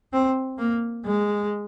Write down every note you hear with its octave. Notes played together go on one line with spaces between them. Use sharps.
C4
A#3
G#3